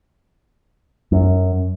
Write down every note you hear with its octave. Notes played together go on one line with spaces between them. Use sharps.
F#2